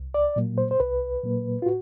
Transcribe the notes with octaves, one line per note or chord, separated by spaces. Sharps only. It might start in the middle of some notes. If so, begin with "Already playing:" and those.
Already playing: C2
D5
A#2 F#3 A#3
C5
C5
C2 B4
A#2 F#3 A#3
F4
A2 F#4